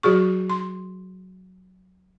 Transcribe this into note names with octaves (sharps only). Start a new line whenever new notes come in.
F#3 F#4 G#4 C#6
C6